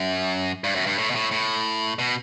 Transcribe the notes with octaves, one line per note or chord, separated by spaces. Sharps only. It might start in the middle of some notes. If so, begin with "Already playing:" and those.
Already playing: F#2
G2
F#2
G2
A2
B2
A2
A2
B2